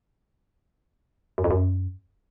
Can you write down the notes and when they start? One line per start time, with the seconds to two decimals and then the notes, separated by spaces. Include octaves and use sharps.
1.38 F#2
1.44 F2
1.51 F#2